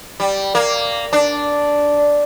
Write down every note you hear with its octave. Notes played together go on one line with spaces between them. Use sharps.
G3
A#3
D4